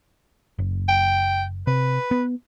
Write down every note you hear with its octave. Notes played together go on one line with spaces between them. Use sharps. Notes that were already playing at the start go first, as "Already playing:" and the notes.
F#1
G5
C3 B4
B3